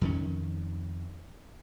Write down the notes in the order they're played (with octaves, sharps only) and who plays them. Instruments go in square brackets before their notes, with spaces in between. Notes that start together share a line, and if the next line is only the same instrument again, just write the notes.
[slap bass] F2 D#3 C#4